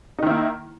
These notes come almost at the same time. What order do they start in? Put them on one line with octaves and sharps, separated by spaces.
D#4 D#3 E4 A#3